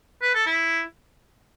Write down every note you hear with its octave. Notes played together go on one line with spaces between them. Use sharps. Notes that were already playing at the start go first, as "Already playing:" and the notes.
B4
A4
E4